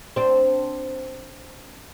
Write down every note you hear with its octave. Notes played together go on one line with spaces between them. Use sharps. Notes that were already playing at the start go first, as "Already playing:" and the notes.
C4 D4